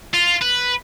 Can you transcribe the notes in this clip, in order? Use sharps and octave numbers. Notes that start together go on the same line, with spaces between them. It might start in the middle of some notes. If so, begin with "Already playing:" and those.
F4
B4